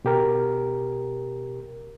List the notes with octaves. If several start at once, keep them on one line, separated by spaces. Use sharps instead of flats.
B2 G4 A#4